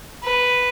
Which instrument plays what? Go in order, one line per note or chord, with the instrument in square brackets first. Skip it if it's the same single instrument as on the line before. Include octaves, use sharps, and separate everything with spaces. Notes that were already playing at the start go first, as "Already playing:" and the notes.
[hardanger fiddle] B4